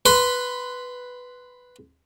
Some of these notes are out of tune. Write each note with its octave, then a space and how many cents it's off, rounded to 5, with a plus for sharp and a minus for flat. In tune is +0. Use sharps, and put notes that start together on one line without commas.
B4 +0 C6 -15